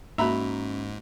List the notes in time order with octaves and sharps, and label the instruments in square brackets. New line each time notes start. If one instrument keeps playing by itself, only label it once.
[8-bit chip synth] G#2 [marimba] A#3 F#4 [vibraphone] C#4 [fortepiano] E5 A#5 B5